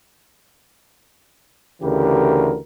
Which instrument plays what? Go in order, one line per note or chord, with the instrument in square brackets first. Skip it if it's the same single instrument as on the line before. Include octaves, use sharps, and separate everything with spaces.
[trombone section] D2 C#3 E3 G4 A#4